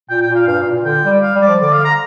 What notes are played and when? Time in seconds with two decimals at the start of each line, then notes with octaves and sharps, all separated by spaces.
0.10 A#2 G5
0.22 G5
0.28 A#2
0.35 F5
0.47 G2 F5
0.60 A#2
0.72 A#2
0.85 D3 G5
1.04 G3
1.22 F5
1.35 G3
1.42 D5
1.48 F3
1.60 D3 D5
1.73 F5
1.85 A#5